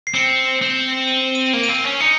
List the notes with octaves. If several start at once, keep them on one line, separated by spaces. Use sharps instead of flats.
C7
C4 C#7
C4
D#7
D#7
A#3
D#7
C4
C#4
D#4 C#7